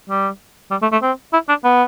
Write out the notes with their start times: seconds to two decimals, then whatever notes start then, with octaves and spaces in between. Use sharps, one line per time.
0.10 G3
0.71 G3
0.82 A3
0.92 A3
1.02 C4
1.33 E4
1.49 D4
1.65 B3